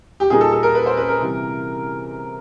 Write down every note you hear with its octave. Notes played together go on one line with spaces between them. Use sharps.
G4
A#2 G3 A#3 D#4 G#4
A4
A4
A#4
B4
C5
B4
A#4
C3 E3 G3